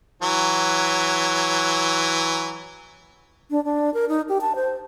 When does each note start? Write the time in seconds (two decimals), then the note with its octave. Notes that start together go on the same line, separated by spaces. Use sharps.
0.22 E3 F#3
3.51 D4
3.65 D4
3.94 A#4
4.09 D#4
4.29 G4
4.41 A5
4.56 C5